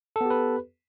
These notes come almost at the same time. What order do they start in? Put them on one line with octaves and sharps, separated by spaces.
A4 B3 G4 B4